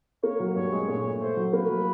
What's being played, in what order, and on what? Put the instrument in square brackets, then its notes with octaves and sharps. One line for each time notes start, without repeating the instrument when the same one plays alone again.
[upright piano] A#3 [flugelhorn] C#5
[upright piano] F#3
[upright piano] G2 [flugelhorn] C#5
[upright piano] G#3
[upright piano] A#2 [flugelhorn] C#5
[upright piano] A3
[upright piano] A3 [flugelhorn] C5
[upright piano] F#3
[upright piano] A#3 [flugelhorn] B4
[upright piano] F#3